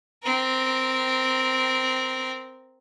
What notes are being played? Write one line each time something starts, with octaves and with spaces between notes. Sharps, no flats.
C4 A#4